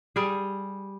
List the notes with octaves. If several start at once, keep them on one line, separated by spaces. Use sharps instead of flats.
G3 G#4